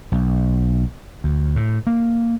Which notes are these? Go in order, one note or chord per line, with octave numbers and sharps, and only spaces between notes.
B1
D2
A2
A#3